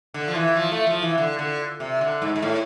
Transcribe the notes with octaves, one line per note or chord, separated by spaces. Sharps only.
D3
F3
E3
F3
A3
F3
E3
D3
D3
C3
D3
G#2
G#2
A2